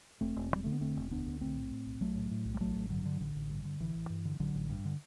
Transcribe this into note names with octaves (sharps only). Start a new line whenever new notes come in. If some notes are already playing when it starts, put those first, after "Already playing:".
E1 A3 C4
E1
D2
G3
D3 A3
B3
E1 A3 C4
E1
D2 B3 D4
D3
B1 A3 C4
A2
A2
B1
B1 F#3 A3
A2
A2
B1
G3
A1 F#3 A3
A1
G2 D3 F#3
D3
A1 D3
A1
G2
D3
A1 E3
A1
G2
D3
A1 D3 F#3
A1
G2
D3